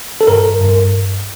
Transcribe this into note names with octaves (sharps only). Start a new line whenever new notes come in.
A4
G2 A#4
G2